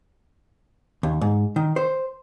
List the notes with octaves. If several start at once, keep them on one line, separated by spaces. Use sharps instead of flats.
D#2
G#2
D#3
C5